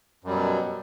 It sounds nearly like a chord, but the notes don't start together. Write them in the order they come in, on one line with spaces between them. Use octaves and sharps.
F#2 G3 F#3 B2